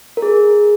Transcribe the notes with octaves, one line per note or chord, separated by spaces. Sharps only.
A#4
G#4